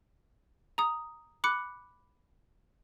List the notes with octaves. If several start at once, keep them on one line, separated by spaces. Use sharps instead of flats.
A#5 D#6
B5 D6 F#6 C#7